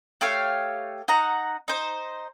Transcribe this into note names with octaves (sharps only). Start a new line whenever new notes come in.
A3 G4 C#5 F5
D#4 F#5 A#5
D#4 C5